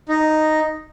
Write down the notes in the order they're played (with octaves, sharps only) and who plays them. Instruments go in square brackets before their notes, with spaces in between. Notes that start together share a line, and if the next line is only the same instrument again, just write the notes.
[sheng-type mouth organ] D#4